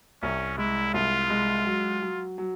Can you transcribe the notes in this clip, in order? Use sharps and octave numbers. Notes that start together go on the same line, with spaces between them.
C2 C#4
G#3 E4
C2 F4
G#3
F#3
F#3
F#3